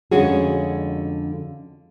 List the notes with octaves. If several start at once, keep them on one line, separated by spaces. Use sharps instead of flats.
F2 D3 G#3 C#4 F#4 G#4